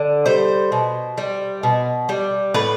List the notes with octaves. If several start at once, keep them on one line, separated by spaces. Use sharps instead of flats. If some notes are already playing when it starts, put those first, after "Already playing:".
Already playing: D3
G3 C5
B2
G3
B2
G3
A2 B4